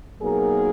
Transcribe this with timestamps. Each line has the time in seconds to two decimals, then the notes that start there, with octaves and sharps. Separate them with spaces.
0.22 B2 F#3 A#3 D#4 G#4 A#4